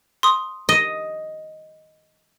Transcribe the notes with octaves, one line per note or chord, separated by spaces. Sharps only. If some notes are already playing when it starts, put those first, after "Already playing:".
C6 D#6
D#5